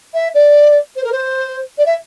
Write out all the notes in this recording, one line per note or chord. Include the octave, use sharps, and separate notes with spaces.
E5
D5
C5
A#4
C5
D5
E5